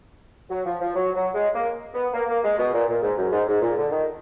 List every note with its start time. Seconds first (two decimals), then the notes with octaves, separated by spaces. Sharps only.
0.50 F#3
0.66 F3
0.80 F3
0.95 F#3
1.14 F#3
1.34 G#3
1.55 A#3
1.94 B3
2.14 A#3
2.29 A#3
2.44 G#3
2.58 B2
2.73 A#2
2.88 A#2
3.02 G#2
3.17 F#2
3.32 G#2
3.47 G#2
3.61 A#2
3.77 D3
3.91 D#3